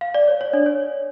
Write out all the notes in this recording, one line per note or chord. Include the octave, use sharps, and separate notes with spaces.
F5
D5
C#5
C#5
D4 D5
C#5